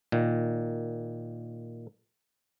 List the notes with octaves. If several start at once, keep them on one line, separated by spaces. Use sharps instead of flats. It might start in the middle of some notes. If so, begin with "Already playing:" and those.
A#2 D#3